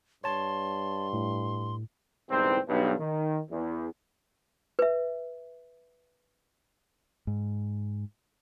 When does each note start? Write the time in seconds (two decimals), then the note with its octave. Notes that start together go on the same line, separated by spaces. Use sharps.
0.24 G2 C#5 A5 C6
1.13 A2
2.31 G1 C2 G#2 C3 E3 C4
2.69 B1 G2
2.99 D#3
3.51 E2
4.79 B4 E5
7.27 G#2